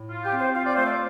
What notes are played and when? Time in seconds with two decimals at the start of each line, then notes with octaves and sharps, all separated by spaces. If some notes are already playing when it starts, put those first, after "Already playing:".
Already playing: A2
0.10 F4
0.25 G4
0.33 C4
0.40 C5
0.55 F4 F5
0.66 D5
0.76 A3 C5
0.87 D5